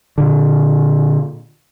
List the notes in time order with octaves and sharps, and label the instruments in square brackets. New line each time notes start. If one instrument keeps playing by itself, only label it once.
[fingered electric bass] A#2 D3